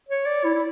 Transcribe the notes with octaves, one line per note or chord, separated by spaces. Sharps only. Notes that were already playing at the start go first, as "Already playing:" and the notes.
C#5
D5
E4
E4